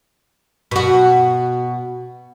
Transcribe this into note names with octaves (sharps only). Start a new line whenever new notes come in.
B2 F#4